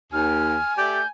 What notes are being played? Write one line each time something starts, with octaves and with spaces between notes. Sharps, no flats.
D#2 G#5 F6
A3 G4 D5 G6